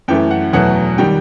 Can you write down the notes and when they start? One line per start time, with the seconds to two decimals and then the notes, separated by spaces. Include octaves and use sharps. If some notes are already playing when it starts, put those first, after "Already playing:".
0.08 F#2 E3 A3 G5
0.31 F#5
0.53 E2 B2 F#3 A3 F#5
0.98 D#3 G3 G5